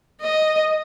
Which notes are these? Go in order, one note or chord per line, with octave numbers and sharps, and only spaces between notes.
D#5